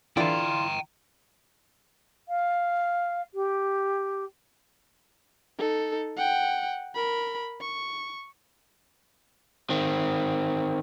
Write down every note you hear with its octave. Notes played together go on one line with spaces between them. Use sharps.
D3 E3 E4 F4 D5 G5 A#5
F5
G4
D#4 A4
F#5 G5
A#4 B5
C#6
D#3 C4